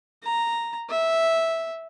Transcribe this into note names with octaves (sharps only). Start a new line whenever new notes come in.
A#5
E5